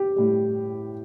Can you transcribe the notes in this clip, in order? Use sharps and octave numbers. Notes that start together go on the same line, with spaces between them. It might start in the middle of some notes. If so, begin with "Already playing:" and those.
Already playing: G3 G4
A2 G3